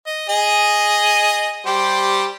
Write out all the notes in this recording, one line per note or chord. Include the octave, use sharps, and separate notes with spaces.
D#5
G#4 D#5
G3 G4 C5